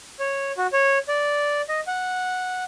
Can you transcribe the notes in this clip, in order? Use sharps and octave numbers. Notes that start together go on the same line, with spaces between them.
C#5
F#4
C#5
D5
D#5
F#5